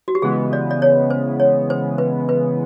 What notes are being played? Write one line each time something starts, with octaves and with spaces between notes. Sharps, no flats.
F#4
G4
C#3 E3 G#3 B3 G#4
D5
D5
C#5
C5
C#5
C5
B4
B4